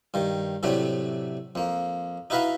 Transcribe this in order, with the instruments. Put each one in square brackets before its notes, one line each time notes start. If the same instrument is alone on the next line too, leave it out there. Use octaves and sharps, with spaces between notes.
[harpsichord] G2 D#3
A2 C3 F#3 A3 D4
F2 A#3
D#4 E4 F#4 B4 F5 B5